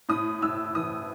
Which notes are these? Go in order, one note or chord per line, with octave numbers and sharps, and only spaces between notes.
A2 D#6
A2 E6
E3 D#6